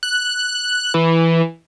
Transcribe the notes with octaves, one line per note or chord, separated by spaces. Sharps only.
F#6
E3